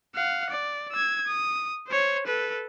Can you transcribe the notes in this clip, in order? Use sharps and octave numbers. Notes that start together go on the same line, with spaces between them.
F5 F#5
D5
E6 G#6
D#6
C5 C#5
A4 B4